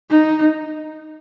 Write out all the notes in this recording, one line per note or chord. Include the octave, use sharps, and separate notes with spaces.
D#4